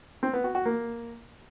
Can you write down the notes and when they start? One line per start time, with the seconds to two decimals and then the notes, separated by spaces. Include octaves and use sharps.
0.23 C4
0.33 B3
0.44 F#4
0.55 F#4
0.65 A#3